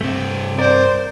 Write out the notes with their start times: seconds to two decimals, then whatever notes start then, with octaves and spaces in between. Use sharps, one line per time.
0.01 G2 C3 A3 C4
0.58 A#4 C5 D5